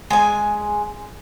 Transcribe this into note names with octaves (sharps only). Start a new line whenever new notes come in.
G#3 G#5